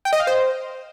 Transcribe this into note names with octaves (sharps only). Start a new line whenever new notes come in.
G5
D#5
F5
C5